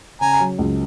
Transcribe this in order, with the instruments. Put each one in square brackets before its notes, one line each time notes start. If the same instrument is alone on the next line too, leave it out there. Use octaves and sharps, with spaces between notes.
[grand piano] C#3 [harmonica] G#5 A#5
[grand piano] F#3
C#2